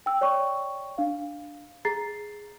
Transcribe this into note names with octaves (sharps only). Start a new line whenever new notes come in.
G5 E6
C#5 D5 G5 C#6
D4 F5
G#4 A#5 A6 C7